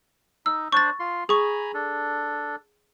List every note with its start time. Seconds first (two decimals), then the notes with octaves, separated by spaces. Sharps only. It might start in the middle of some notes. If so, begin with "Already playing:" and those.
0.46 D#4 E6
0.72 D4 C5 D5 C#6 A6
1.00 F4 C6
1.29 G#4 G#5 A#5 B5 C#6
1.74 D4 A4